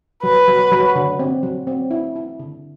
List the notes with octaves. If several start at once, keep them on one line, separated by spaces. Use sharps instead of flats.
F#3 B4
F#3
F#3
D3
C4
F#3
C4
E4
E4
D3